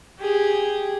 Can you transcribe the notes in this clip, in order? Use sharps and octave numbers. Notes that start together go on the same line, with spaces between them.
G4 G#4